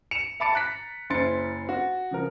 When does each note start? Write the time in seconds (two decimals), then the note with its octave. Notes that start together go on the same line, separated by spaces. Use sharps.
0.11 C#7 E7 F7
0.40 E5 A5 B5 D6 A6 C#7
0.53 A#5 F#6 B6
1.10 F#1 C#4 E4 C6 A6 C#7
1.69 F#4
2.11 C#3 F3 A#4